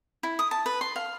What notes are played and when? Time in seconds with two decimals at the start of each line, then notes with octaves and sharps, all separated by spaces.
0.23 E4
0.39 D#6
0.51 A5
0.66 B4
0.81 C6
0.96 F5